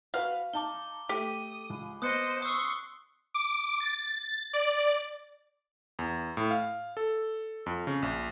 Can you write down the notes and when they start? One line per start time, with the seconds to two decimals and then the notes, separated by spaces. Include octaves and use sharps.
0.14 F#4 B4 F5 F6
0.53 D#4 A5 D6 G7
1.09 A3 G4 D#6
1.70 C#2
2.02 B3 C5 D#5 D#6 F#6 C#7
2.42 C6 C#6 D#6 E6
3.34 D6
3.80 A6
4.53 D5
5.99 E2
6.37 A2
6.51 F5
6.97 A4
7.66 F2
7.87 C#3
8.02 A#1